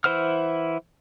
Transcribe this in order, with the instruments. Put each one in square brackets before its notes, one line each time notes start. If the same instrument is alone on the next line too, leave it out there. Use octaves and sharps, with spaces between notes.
[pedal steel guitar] E3 E4 C5 F#5 F6